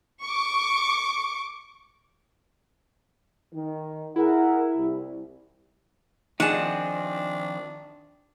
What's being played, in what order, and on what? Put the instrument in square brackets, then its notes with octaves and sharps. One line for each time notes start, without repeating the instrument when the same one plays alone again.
[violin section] C#6 D6
[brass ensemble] D#3
[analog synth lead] E4 [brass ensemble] G#4 A#4 F#5
[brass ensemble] C2
[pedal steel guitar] D#3 F3 C4 [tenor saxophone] D4 [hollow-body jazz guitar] D#4 G#4 [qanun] F#5 A5